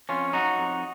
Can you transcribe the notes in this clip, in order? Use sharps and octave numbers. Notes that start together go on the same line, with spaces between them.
F2 C#4 F4
F#3 D#4 F#4
F2